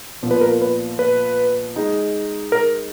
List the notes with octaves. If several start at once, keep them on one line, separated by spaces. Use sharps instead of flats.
A#2 F3 B3
B4
A#4
B4
B4
G#3 D#4 G#4
A#4